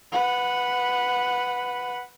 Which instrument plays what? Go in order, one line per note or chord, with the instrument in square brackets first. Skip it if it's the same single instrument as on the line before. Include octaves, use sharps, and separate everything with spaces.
[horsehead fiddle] B4 F#5